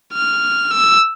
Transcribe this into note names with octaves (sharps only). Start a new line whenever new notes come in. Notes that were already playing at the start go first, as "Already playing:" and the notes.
F6
E6